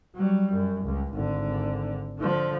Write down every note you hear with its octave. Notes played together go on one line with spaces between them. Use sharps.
F#3 G3
F#2
C#2
G#1 D3
D3 F3